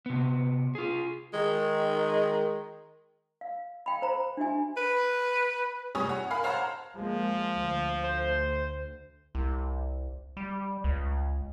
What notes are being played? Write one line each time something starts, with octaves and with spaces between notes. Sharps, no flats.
C3 B3
F4 G#4
D#3 G#3
F5
F5 G5 B5
C5 A#5
D4 E4 F#4 E5 G#5
B4
C3 G3 C#5 G#5 C#6 D#6
C#5 F#5
A#4 F5 G#5 B5
C5 C#5 F5 F#5 A5 A#5
F3 G#3 A#3
D2
C5
C2
G3
C#2